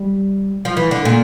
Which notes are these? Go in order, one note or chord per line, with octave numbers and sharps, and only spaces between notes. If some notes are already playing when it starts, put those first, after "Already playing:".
Already playing: G3
F3
E3
D3
A#2